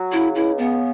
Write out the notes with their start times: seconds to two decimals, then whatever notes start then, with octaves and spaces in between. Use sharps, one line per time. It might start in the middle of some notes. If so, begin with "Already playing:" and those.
Already playing: F#3
0.12 C#3 E4
0.35 C#2 E4
0.58 C#3 B3